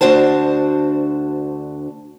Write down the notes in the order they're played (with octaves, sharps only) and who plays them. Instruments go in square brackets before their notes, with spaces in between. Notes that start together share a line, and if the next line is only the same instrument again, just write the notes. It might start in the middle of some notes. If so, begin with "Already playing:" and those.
[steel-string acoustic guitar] D2 D4 F#4 C5 A5